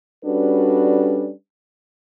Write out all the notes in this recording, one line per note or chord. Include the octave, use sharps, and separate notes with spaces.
G3 C#4 D4 F#4 A4 B4